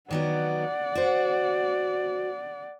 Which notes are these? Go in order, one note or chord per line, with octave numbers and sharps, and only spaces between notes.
D#3 F#3 B3 D5 F#5
F#4 C5